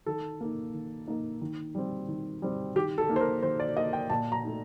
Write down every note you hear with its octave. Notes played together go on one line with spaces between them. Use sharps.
D#3 A4
A#3 D#4
D#3
A#3 D#4
D#3
G3 C4
D#3
G3 C4
D#3 G4
A4
A#3 D#4
C5
A#4
D#3 C5
D5
A#3 D#4 D#5
G5
A#2 A5
A#5
A3 D#4